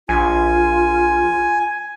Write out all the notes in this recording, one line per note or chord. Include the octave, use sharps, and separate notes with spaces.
A#1 F4 G#5